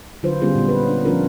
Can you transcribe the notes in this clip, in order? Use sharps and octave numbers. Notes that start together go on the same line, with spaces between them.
D3 F#3 F4 B4 C5
D3 G3 B3 C#4 F4 G#4
A#2 B3
B4
D4 C#5
F3 C#4 D4 F4 A#4